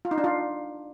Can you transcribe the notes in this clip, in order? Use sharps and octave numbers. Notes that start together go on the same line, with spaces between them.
F4
D#4
D4
F4